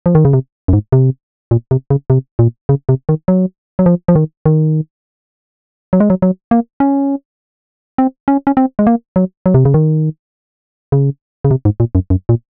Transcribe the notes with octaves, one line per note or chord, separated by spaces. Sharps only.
F3
D#3
C#3
C3
F#2
G#2
C3
A#2
C3
C#3
C3
A#2
C#3
C3
D#3
F#3
F#3
F3
F3
D#3
D#3
F#3
G#3
F#3
F#3
A#3
C#4
C4
C#4
C#4
C4
G#3
A#3
F#3
F#3
C3
C#3
D#3
C#3
C#3
C3
G#2
A#2
F#2
F#2
A#2